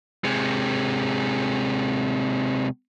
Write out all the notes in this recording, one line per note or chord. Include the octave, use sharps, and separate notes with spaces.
C3 G#3